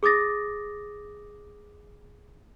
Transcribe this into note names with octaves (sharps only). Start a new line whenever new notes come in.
G#4 D6 D#6 A6 A#6